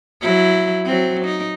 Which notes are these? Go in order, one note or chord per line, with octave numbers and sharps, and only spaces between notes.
F#3 E4
F#3 C4
D#4